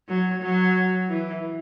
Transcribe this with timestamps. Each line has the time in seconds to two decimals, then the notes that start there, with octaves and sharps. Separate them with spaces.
0.08 F#3
0.42 F#3
1.08 E3